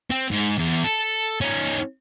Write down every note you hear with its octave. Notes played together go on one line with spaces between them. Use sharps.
C4
G#2
E2
A4
C#4 D#4